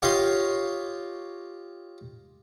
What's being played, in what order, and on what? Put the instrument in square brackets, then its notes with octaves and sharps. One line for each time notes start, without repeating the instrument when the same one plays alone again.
[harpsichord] F4 G4 C#5 D#5 F5